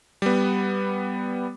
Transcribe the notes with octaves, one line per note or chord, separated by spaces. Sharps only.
G3 B3